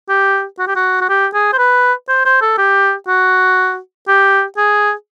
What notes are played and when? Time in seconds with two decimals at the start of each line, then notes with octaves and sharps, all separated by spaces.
0.09 G4
0.59 F#4
0.67 G4
0.75 F#4
1.01 F#4
1.09 G4
1.34 G#4
1.53 C5
1.58 B4
2.08 C5
2.25 C5
2.41 A4
2.58 G4
3.08 F#4
4.08 G4
4.57 G#4